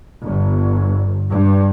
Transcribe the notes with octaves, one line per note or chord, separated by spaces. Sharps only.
G1
G2